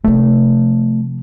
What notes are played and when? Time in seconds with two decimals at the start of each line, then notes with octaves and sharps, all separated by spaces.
0.04 C3 F3 A3